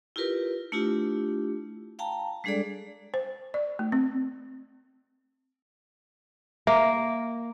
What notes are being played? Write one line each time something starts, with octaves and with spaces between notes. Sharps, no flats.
E4 F4 G4 A#4 B4
A3 D4 E4 F4 G4
F5 G5 A5 A#5
G3 G#3 D4 G#4 A4 D5
C5
D5
A3
C4
A#3 E5